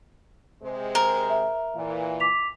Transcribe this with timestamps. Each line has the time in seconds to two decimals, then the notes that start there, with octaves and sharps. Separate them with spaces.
0.63 C3 G#3 C5
0.95 A#4
1.30 E5
1.75 A#2 E3 F5
2.20 D6 B6 F7